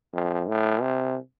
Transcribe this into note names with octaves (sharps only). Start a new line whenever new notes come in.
F2
A2
C3